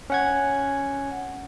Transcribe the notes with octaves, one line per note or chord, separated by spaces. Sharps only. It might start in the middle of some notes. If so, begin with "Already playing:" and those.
C#4 F#5 G#6